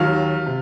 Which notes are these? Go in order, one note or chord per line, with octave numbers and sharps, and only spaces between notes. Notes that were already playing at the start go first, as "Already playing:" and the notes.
Already playing: D#2 D#3 F#3 F4 F5
C3